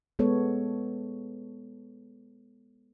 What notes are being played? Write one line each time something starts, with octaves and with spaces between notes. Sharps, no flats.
G#3 B3 A4 C#5